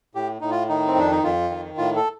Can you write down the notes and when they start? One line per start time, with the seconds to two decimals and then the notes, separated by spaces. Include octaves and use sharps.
0.15 A2 G4
0.41 A2 D#4
0.51 F4
0.69 D#3 D#4
0.87 C4
0.96 F2 D4
1.11 D#4
1.23 F2 F4
1.50 D#3
1.77 A2 F4
1.96 A4